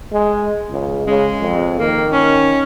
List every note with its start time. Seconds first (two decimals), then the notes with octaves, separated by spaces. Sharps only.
0.12 G#3
0.70 C#2
1.07 C#3 G#3
1.40 F2
1.79 D#3 A#3
2.12 C#4